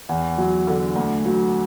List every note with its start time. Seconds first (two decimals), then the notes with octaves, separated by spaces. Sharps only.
0.09 E2
0.38 F#3
0.67 D3
0.96 D2
1.25 F#3